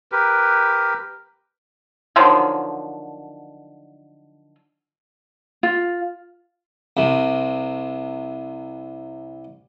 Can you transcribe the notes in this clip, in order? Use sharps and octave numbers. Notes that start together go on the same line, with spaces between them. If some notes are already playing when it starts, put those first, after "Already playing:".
G4 A#4 B4
D3 D#3 F3 F#3
F4
C2 C3